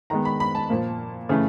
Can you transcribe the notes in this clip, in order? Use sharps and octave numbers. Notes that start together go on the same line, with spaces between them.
D#3 G#3 B3 A#5
B5
B5
A5
A#2 F3 A#3
C#3 E3 A3